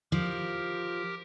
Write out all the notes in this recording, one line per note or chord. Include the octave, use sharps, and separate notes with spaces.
F3 G4 A#4